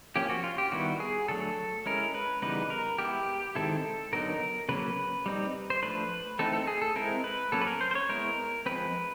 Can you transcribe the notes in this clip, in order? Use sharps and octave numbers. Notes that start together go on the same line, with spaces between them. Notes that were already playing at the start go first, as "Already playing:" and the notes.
F3 A#3 C#4 G4
F#4
F4
G4
D#3 G3 B3 E4 F#4
G#4
D3 F#3 A3 A4
G#3 C#4 E4 A#4
B4
C#3 E3 G3 B3 D#4 B4
A#4
G#3 B3 E4 G4
D#3 G#3 C4 E4 A4
D3 F#3 B3 D#4 A#4
C#3 F#3 A#3 C#4 B4
G3 C4 D#4
C5
F3 A3 D4 B4
E3 A3 C4 D#4 A4
A4
G#4
A4
G#3 C4 E4 A#4
B4
F#3 A#3 C#4 A4
B4
A#4
C5
C5
C#5
G#3 B3 E4 A#4
F3 G#3 C4 B4